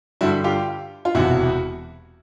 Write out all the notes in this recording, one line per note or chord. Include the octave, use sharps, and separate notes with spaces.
G2 D3 G3 E4 F#4
F4 G4
F4
E1 E2 C3 E4 F#4